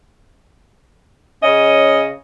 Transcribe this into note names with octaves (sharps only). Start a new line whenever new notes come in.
C#3 C#4 D#5